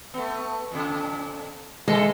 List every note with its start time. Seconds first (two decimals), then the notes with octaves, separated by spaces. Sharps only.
0.14 A3 B3
0.71 F2 A#2 C#3
1.88 D3 E3 G#3 A4